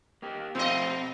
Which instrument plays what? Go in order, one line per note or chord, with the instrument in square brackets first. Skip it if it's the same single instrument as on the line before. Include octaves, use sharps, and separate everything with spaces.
[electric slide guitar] A#3 G4
[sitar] B2 D#5 [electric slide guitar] F3 A3 F4 [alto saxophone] C4